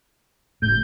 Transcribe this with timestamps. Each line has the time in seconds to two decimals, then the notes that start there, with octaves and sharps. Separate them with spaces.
0.62 G1 A2 G6